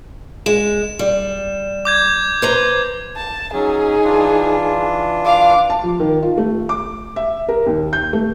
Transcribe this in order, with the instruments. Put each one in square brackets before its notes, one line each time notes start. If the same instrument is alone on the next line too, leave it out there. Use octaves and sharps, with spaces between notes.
[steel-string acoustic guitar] G#3 [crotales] E7
[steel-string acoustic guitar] G3
[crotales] D6 G6 G#6
[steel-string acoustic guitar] B4 C5 A#5
[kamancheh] A5
[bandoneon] F#3 C#4 [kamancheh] D#4 G#4
[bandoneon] E3 D4 F4
[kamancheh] F5 D6
[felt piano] A5
F3
D#3
F4
A3
D6
E5
A#4
D#2
G6
A3